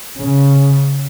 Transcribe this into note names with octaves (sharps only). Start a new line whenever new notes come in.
C#3